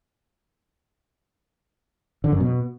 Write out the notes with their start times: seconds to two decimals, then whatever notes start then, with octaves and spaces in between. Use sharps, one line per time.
2.24 D3
2.32 F#2
2.40 B2